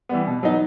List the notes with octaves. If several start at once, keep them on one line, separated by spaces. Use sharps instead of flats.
E3 G3 B3
B2
F#3 B3 D#4